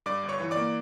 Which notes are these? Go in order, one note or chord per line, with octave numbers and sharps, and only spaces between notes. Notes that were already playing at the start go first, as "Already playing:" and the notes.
G2 D5 D6
G1
C#5 C#6
E3
D5 D6
A#3